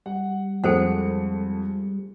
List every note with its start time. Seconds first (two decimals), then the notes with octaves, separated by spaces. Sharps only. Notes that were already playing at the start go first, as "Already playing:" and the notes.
0.06 G3 F#5
0.64 F2 F3 G#3 A4 C5 F#5 C#7